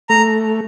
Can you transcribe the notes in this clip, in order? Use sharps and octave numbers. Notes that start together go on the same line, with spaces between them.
A3 A#5